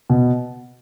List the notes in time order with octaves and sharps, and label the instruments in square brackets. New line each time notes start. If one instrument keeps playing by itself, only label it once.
[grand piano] B2